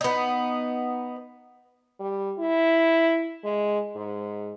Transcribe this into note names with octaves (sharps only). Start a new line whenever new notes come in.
B3 D#4
G3
E4
G#3
G#2